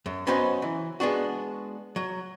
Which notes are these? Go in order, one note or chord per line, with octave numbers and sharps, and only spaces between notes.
F#2
F#3 B3 C#4 D#4 F#4 C5
E3
G#3 B3 D4 F#4
F#3